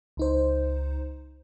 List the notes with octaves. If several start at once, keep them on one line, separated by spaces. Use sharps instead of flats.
C#2 D#4 C5